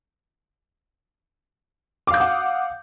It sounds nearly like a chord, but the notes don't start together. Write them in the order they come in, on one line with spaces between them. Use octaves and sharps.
D6 F5 G6 D#6 F#5